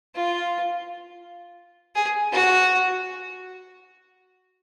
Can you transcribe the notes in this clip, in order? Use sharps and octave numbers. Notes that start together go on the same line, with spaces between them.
F4
G#4
F#4